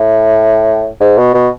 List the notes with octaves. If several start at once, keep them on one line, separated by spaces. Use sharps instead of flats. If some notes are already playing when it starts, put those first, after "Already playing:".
Already playing: A2
G#2
B2
B2